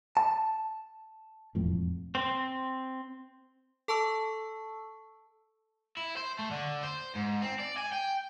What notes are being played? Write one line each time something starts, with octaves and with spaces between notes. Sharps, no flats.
A5
E1 F2 A2
C4
A4 A5 C#6 E6
E4
C5
A3
D3
C5
G#2
C4
D5
G#5
G5